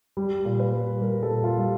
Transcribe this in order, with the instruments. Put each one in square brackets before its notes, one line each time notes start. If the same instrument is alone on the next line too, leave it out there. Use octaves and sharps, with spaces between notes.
[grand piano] G3
A#2
B4
G3
G3 A#4
A4
A#2
F4
G3